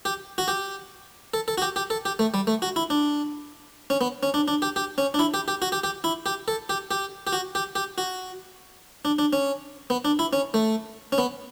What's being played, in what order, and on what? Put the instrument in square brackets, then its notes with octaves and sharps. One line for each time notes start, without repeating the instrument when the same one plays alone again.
[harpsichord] G4
F#4
G4
A4
A4
F#4
G4
G4
A4
G4
A3
G3
A3
F#4
E4
D4
C#4
B3
C#4
D4
D4
G4
G4
C#4
D4
E4
G4
G4
F#4
G4
G4
E4
G4
A4
G4
G4
G4
F#4
G4
G4
F#4
D4
D4
C#4
B3
D4
E4
C#4
A3
C#4
B3